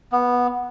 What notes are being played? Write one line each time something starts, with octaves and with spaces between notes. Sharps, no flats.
B3